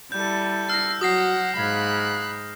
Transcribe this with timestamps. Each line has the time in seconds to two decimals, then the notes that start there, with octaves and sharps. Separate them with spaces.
0.12 G3 E4 A4 G6
0.70 E6 F6 A#6 C7
1.01 F#3 F#4 F#5 D#6 A#6 C7
1.57 G#2 F5 B5 F6 F#6 G#6